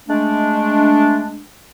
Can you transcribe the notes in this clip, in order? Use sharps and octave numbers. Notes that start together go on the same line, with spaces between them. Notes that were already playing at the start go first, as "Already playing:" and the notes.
G#3 A3 D4